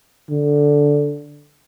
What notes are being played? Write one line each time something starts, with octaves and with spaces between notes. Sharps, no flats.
D3